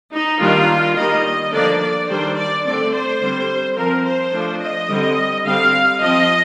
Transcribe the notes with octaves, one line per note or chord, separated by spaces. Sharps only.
D#4
D#3 G3 A#3 D4 F4
D#3 G3 A#3 D#5
D3 F3 A#3 D4 D5
D5
D#3 G3 D4 C5
D5
D3 A3 C4 D5
C5
D3 G3 C4
F3 C4 A#4
C5
F3 A3 D4
D#5
D3 G3 C4
D3 G3 C4 F5
F3 C4 D#5